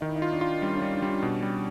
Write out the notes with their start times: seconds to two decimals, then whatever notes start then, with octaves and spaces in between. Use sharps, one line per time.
0.01 D#3 D#4
0.09 E4
0.16 D#4
0.22 F4
0.32 D4
0.41 F4
0.62 G3 C#4
0.77 C#4
0.82 G3
0.93 D4
1.02 G3
1.08 C#4
1.23 B2
1.42 G3